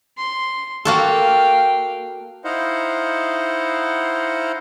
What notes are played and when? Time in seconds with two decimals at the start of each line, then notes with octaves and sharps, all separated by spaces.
0.18 C6
0.85 A#3 F#4 A4 F5 G5
2.45 D#4 E4 C5 D#5 F5 F#5